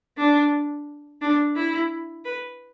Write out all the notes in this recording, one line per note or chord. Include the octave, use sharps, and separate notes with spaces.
D4
D4
E4
B4